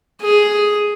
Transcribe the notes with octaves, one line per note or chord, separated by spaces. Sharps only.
G#4